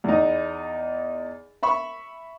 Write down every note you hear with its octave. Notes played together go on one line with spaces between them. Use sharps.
E2 D#4
E5 B5 C#6